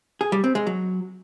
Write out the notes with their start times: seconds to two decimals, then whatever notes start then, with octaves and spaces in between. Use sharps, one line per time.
0.21 G#4
0.32 G3
0.44 C4
0.55 G#3
0.67 F#3